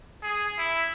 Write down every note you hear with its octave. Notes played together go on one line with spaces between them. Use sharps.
G#4
E4